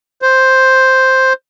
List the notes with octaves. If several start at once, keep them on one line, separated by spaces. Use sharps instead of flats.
C5